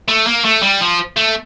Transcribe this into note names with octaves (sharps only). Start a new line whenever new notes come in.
A3
A#3
A3
G3
F3
A3